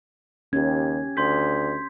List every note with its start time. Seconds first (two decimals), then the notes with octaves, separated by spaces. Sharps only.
0.53 D#2 C#4 G4 G#6
1.17 D2 C6 G6 B6